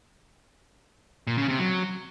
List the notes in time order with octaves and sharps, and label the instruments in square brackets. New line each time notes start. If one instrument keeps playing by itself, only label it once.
[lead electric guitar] A#2
C#3
C3
F#3